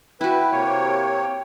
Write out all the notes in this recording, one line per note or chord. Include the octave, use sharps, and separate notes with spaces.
E4 F#4 B4 G5
C3 A#3 C#5